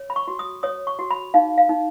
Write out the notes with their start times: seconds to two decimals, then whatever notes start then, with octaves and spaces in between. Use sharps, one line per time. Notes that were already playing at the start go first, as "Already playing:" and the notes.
Already playing: C#5
0.10 B5
0.16 C#6
0.28 F#4
0.39 D#6
0.63 C#5 D#6
0.87 C#6
0.99 F#4
1.11 B5
1.34 D#4 F5
1.58 F5
1.69 D#4